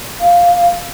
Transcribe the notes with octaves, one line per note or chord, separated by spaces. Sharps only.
F5